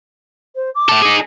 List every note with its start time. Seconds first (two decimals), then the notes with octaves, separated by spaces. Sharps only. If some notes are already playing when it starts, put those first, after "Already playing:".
0.55 C5
0.75 D6
0.89 A2 A4
1.02 D#4 G#4